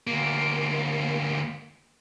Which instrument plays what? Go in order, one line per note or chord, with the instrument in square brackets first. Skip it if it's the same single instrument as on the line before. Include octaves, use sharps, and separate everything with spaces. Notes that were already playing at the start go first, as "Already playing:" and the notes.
[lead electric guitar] D2 A#3